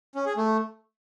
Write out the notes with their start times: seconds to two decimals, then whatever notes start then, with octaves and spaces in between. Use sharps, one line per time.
0.15 C#4
0.26 G#4
0.37 A3